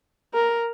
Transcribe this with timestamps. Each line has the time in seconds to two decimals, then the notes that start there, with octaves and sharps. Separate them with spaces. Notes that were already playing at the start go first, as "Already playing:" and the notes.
0.34 A#4